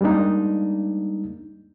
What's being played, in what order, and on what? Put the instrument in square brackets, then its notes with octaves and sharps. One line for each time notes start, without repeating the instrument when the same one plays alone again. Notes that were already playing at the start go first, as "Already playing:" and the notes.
[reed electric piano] G3 G#3 A#3 D4 D#4